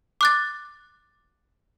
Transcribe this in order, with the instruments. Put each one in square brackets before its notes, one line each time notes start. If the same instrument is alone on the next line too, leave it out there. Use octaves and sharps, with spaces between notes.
[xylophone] D6 F#6 A6